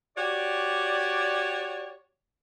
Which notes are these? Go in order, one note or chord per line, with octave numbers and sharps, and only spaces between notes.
F#4 G4 C#5 D5